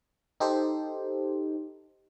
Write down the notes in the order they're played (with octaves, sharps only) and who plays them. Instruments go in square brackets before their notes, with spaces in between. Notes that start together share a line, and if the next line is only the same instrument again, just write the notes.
[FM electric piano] D#4 G4 A4 C5